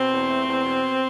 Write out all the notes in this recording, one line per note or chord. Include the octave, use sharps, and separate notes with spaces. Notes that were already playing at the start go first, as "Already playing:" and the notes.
Already playing: B2 C4
E2
A3
E2
B2